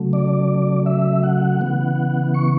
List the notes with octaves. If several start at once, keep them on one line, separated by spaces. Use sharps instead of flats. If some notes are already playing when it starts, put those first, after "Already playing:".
Already playing: C#3 F#3 A3
D5
E5
F#5
C#3 E3 B3
C#6